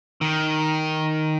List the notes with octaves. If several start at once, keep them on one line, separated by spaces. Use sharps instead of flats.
D#3